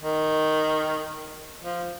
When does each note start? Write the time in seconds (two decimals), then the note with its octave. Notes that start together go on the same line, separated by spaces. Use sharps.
0.01 D#3
1.63 F3